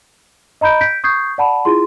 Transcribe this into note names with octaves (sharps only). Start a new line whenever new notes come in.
D#5 A#5 B5 G6 D7
G6 B6 D7
C#6 D#6 G6 G#6 C7
D5 F#5 A5 B5
E4 F4 G#4 C6